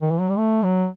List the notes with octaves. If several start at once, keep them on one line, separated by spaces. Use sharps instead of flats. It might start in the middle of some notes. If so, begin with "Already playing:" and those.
D#3
E3
F#3
G3
A3
F#3